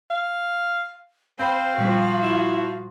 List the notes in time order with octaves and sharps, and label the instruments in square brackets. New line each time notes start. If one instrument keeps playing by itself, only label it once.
[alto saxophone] F5
[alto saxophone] C4 [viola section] C5 [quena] F5 [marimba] G5 B5
[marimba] A#2 G3 [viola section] F3 F#4
[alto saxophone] E4